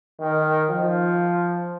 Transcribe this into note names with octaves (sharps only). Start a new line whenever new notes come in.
D#3
F3